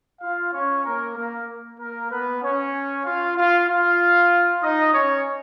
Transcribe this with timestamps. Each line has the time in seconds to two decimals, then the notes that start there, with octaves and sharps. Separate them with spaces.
0.21 F4 F5
0.53 C#4 C#5
0.85 A#3 A#4
1.16 A#3 A#4
1.79 A#3 A#4
2.11 B3 B4
2.42 C#4 C#5
3.05 F4 F5
3.36 F4 F5
3.68 F4 F5
4.63 D#4 D#5
4.94 C#4 C#5